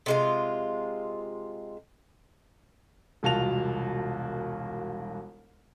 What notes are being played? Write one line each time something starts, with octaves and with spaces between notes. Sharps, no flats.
C3 G#3 F4
E1 C2 F4 F#4 A5 F7